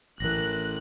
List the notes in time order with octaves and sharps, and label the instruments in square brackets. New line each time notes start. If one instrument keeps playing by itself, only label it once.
[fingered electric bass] A1 E3 [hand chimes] A#4 A#6 [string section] F#6